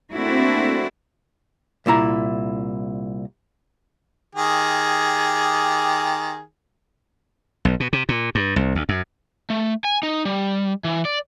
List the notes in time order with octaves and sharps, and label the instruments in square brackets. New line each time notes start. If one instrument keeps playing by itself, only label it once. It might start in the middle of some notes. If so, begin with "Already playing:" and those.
[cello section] A3 A#3 C4 D4 E4 F#4
[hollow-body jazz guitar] C2 A#2 E4 A#5
[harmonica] D#3 G4 G#4
[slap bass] B1
B2
C3
A#2
G2
C2
D2
F#2
[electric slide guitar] A3
G#5
D#4
G3
E3
D5